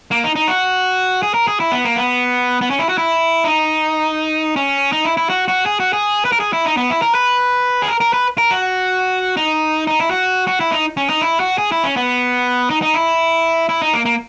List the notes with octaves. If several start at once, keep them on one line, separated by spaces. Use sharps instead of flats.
A#3
D#4
D#4
F#4
G#4
A#4
G#4
E4
B3
A#3
B3
B3
C#4
E4
F#4
E4
D#4
C#4
D#4
E4
E4
F#4
F#4
G#4
F#4
G#4
B4
A#4
G#4
E4
D#4
B3
E4
A#4
B4
G#4
A#4
A#4
B4
A#4
F#4
D#4
D#4
E4
F#4
F#4
E4
D#4
C#4
D#4
E4
F#4
G#4
E4
C#4
B3
D#4
D#4
E4
E4
D#4
A#3
A#3